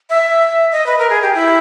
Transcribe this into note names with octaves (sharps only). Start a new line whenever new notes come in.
E5
D#5
B4
A#4
G#4
G4
E4